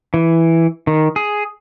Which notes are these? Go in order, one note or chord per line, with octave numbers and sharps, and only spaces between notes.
E3
D#3
G#4